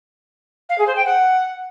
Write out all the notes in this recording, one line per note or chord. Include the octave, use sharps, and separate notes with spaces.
F5
G#4
C5
G5
F#5